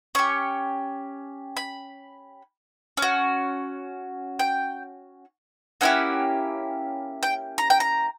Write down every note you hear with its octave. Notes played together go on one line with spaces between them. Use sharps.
C#4 G4 C#6
B5
C#4
F#4
G5
A#3 C#4 E4 G4 F#5
G5
A#5
G5
A#5